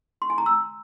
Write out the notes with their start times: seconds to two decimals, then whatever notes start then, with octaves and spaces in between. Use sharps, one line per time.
0.22 C6
0.30 G#5
0.38 A#5
0.46 E6